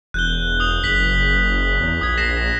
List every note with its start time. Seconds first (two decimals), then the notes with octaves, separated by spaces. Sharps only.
0.14 E1 F#6 G6 G7
0.60 D#6 F7
0.84 F#1 B6 F#7
1.80 E2
2.01 A#1 D#6 G#6
2.18 A#6 C7 E7